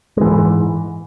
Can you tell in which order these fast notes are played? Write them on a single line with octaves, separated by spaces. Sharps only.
G#3 E3 G#2